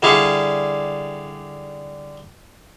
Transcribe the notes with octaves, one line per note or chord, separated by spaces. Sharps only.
D3 G3 E4 G#4 F5 C#6